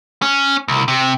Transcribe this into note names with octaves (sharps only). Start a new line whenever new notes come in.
C#4
C2
C3